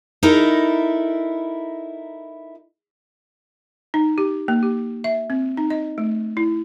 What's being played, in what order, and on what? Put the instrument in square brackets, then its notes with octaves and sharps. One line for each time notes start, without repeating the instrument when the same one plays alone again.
[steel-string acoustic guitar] D#4 E4 A4 A#4
[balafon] D#4
G4
A#3
G4
E5
C4
D#4
D#5
A3
E4